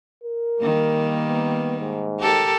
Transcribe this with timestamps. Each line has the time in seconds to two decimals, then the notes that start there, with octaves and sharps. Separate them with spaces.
0.24 A#4
0.60 D#3 G3 A#3
1.25 B3
1.80 G#2
2.20 G4 A4 A#4